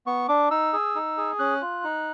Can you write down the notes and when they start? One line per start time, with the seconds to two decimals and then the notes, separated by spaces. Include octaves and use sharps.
0.07 B3 C#6
0.28 D4 D6
0.51 D#4 E6
0.73 G#4
0.95 D#4
1.17 G#4
1.39 C#4 F#6
1.62 F4
1.84 D#4